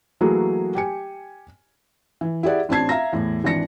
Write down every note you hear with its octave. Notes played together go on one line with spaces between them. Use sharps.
E3 F#3 A3 A#3 F#4 G#4
G4 G#5 C#7
E3
E4 G4 G#4 D5 F#5
A1 C4 D4 A5 G#6 C7
E5 F5 A#5 A#6
E2 A2
G#1 E3 D4 A#6 C#7